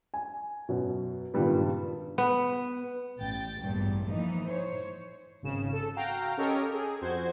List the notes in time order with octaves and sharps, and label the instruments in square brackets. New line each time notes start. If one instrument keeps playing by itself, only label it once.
[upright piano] G#5
F#2 B2
C#2 G2 A#2 D#3 G3 B3
[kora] B3
[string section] A1 G5 A6
A1 E2 G2 A#2
E3 F3 A#3 D#4
C5 C#5
[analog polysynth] G#1 C#3 E7
A4
F#4 F5 G5 A#5
C#4 G4 A4 A#4 C#5 D#5
G#4 A4
F2 F#4 C5 G#6